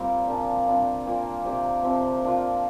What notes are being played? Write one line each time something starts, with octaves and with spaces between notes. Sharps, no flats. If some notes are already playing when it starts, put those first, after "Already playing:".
Already playing: G3 A#3 C4 F4 A#4 D5
A#2 F3 D4 A#4
C3 G3 D4 F4
A#2 A#3 F4 C5
C3 A#3 G4 D5
C3 F3 C4
A#3 D4 F4